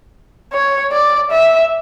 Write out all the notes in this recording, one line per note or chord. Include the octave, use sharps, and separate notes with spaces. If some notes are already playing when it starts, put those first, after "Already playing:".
C#5
D5
E5